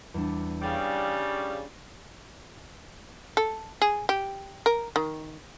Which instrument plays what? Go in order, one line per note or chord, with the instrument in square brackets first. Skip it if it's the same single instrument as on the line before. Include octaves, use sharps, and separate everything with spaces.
[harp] E2 G3 D4
[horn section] C#3 G3 [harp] F5 G5 D6
[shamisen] A4
G#4
G4
A#4
D#3